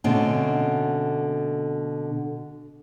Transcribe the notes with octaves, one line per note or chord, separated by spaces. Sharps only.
B2 D3 A3 C4 C#4